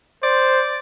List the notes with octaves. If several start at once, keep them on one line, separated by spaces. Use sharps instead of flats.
C5 D5